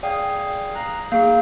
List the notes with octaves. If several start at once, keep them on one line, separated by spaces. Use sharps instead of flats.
G#4 D5 F5 G5
A#5 F#6
A#3 D#4 G#4 F5